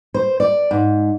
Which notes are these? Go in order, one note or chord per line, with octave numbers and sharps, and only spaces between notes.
C5
D5
G#2